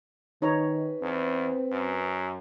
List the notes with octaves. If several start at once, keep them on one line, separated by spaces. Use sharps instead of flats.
D#3 D#4 B4 C#5 A#5
E2 C4
F#2